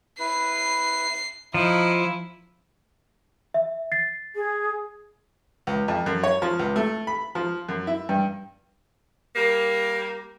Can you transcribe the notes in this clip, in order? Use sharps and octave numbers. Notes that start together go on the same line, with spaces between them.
E4 B4 C7
F3 E4 D#5 A#5
E5
A6 C7
G#4
C#2
F2
F#2
C#5
F3
C#2
A3
B5
F3
F#2
E4
G2
G3 A#3